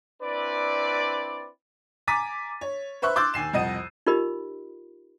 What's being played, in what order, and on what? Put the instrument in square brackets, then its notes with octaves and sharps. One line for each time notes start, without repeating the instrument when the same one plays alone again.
[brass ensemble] C4 D4 E4 B4 D5
[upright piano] G#5 A#5 D6 A6 B6 D#7
C#5
B4 C5 E5 C#6 F#6
C6 D6 E6 F#6 G6 A6
D#2 G#5 C7 E7
C2 F2 D#5 F#5 D#7
[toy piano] D#4 F4 G4 A#4 D#5 B5